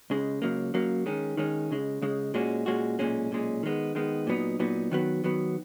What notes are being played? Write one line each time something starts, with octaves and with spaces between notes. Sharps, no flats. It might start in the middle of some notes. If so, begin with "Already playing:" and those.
C#2 C#3 G#3
C#2 C#3 F#3 A#3
C#2 C#3 F#3 A#3
D#3 G#3 C#4
D#3 G#3 C#4
C#2 C#3 G#3
C#2 C#3 G#3
A#2 G#3 C#4 F#4
A#2 G#3 C#4 F#4
B1 A#2 G#3 C#4
B1 A#2 G#3 C#4
D#3 G#3 B3
D#3 G#3 B3
A#2 F#3 B3 D#4
A#2 F#3 B3 D#4
D#3 F#3 B3
D#3 F#3 B3